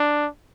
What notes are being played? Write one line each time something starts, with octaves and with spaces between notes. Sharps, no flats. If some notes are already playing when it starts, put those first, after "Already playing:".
Already playing: D4